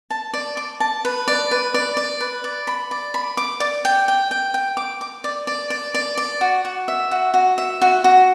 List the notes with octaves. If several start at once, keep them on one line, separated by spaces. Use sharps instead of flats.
A5
D5
D6
A5
B4
D5
B4
D5
D5
B4
D5
B5
D5
B5
D6
D5
G5
G5
G5
G5
D6
D6
D5
D5
D5
D5
D5
F#4
F#4
E5
F#4
F#4
E5
F#4
F#4